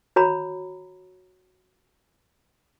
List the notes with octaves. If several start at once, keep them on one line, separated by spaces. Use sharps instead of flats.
F#4 C#5 A#5 B5